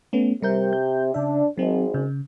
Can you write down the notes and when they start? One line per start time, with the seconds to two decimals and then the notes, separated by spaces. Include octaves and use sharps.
0.13 A3 B3 C#4
0.42 C3 G3 A#4 G6
0.73 G6
1.14 C#3 D4 E5
1.58 G#1 G#2 F#3 C4
1.94 C#3